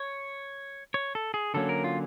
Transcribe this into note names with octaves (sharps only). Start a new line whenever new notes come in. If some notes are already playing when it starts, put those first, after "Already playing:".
Already playing: C#5
C#5
A4
G#4
D3 F#3 A#3 C#4 A4
A#4
F4